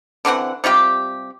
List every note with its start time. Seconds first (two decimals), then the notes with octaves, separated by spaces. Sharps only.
0.25 D3 E3 C4 F#5
0.64 C3 G3 F4 G4